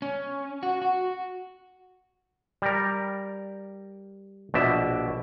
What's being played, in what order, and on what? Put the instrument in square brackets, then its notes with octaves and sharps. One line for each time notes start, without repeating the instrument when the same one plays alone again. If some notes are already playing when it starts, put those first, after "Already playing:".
[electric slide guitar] C#4
F#4
F#4
[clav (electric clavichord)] G3 A#4
A#1 B2 D5 E5